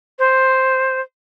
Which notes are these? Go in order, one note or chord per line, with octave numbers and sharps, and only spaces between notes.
C5